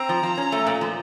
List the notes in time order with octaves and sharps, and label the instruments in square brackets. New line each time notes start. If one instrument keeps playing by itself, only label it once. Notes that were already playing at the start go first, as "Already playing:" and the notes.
Already playing: [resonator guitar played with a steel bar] C4 [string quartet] A#5
[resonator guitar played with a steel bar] F3
F3
C#4
A3
A#2
F3